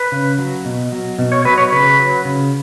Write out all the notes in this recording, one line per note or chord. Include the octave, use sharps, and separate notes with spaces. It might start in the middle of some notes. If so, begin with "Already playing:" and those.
Already playing: B4
C#3
F#3
B2
F#3
B2
C#5
F#3 B4
C#5
C#3 B4
F#3
C#3